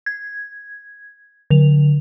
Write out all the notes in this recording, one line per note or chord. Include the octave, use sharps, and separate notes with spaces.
G#6
D3 F7